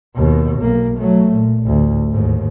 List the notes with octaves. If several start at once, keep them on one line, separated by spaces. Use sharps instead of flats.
D#2 B2
B1 A#3
F#3 A3
A#2
A1 D2
D#2 G#2